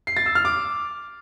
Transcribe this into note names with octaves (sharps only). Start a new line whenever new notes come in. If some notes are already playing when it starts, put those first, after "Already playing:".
C7
A6
E6
F6
D6